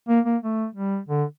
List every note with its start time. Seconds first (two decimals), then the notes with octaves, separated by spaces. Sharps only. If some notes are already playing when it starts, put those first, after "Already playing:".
0.09 A#3
0.25 A#3
0.43 A3
0.75 G3
1.09 D3